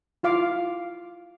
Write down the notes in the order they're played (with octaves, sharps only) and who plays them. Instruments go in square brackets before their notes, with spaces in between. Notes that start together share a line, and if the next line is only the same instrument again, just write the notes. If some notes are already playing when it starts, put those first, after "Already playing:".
[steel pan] E4 F4 F5 D6